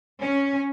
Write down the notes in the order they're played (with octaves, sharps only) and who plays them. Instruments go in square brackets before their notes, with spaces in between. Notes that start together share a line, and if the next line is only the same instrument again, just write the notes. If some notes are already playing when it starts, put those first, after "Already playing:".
[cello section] C#4